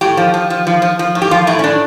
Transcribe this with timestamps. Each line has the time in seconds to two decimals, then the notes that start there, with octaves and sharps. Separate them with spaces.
0.01 A2 G4
0.17 F3
0.34 F3
0.50 F3
0.67 F3
0.82 F3
0.99 F3
1.15 A2
1.22 G4
1.31 F3 F4
1.47 A2 E4
1.59 C#4
1.64 A2 D4